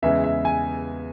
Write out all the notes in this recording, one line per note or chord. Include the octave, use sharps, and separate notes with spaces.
E2 C#3 E3 G#3 E5
E5
G#5